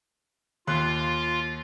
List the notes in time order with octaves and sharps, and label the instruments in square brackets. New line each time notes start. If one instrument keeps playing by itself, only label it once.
[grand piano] D#2 C6 F#6 [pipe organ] F4